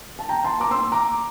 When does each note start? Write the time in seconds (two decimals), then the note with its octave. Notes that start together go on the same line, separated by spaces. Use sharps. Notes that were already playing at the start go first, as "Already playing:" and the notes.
0.19 A5
0.29 G5 A#5
0.44 A5 C6
0.60 A#5 D6
0.71 C6 E6
0.92 A#5 D6